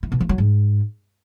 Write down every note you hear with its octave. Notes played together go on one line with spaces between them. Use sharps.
E3
B2
F3
F#3
G#2